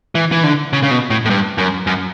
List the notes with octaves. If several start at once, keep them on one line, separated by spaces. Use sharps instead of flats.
E3
E3
D3
C#3
C#3
B2
A2
A2
G2
F#2
F#2